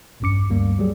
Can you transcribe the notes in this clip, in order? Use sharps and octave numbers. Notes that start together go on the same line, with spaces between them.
A#1 E2 G2 C#4 D6 C#7
D2 G2 G3 A#3
F#3 G3 G#4